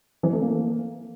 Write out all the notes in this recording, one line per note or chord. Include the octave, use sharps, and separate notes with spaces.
E3
A3
A#3